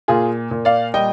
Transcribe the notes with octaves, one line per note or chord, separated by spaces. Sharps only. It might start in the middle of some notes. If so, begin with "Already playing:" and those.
A#2 F4 G#4
A#2
D5 F5
G3 D#5 G5